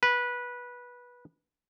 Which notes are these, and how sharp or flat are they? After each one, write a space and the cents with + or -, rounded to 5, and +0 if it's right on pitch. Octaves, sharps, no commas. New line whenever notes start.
B4 -15